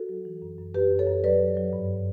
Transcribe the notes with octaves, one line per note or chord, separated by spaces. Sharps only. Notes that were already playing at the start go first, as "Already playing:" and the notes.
Already playing: F#4 A4
F#3
E3
F#2
F#2
F#2 G4 B4
F#2
A4 C#5
F#2
F#3 B4 D5
F#3
F#3
G2